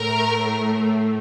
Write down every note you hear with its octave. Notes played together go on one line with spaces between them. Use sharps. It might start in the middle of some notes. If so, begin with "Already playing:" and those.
Already playing: A2 A3 A#4